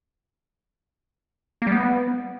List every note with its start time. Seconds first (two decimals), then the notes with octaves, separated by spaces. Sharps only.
1.62 A#3
1.67 G3
1.72 B3